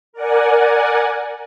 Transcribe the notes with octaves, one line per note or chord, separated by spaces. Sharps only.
A#4 D5 F#5 G#5